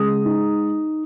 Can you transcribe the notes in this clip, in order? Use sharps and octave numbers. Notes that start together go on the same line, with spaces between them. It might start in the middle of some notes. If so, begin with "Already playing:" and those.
Already playing: C#3 G#3 D#6
D#4